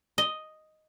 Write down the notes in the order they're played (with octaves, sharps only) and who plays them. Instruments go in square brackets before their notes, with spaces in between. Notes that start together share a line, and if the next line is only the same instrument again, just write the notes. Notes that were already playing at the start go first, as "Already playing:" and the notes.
[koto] D#5